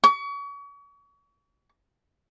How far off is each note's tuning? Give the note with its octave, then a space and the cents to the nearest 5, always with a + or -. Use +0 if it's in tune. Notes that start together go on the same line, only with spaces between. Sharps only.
C#6 +35